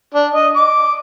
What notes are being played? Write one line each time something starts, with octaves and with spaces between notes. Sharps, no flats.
D4
D#5
D6